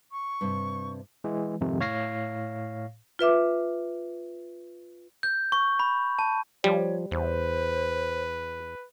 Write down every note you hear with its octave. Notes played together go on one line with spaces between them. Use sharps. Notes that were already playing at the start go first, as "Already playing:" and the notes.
C#6
G2 C3
E3 G#3
F2 G#2 C3 D#3
A2 C#5 F5 A#6 C7
F4 B4 E5 D6
G6
C#6
B5
A5
F3 G3 C#5
E2 B4 C5